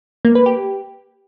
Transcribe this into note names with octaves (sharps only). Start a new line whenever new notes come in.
A#3
B4
G4